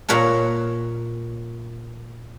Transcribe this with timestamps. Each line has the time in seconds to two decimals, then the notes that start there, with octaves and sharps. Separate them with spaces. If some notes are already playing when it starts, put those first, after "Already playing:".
0.09 A#2 A#4 C#5 A5